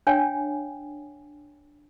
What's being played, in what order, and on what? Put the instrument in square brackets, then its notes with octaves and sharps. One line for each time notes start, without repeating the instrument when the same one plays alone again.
[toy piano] D4 C#5 F5 G5 G#5